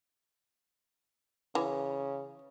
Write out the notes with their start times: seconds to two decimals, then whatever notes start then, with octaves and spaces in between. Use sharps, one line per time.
1.55 C#3 E3